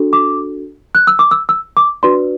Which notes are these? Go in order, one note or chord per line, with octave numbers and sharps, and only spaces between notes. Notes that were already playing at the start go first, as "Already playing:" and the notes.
Already playing: D4 F#4 A4
D6
F#6
E6
D6
E6
E6
D6
D4 F#4 B4 D5 C6